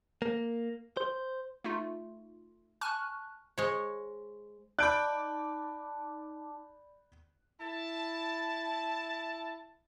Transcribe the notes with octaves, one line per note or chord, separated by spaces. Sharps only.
A#3
C5
A3 D#4 F4
G#5 A5 C#6 F6 F#6
G#3 C5 C#5 C#6
D#4 D5 A5 B5 D6 F#6 G6 D7
E4 A5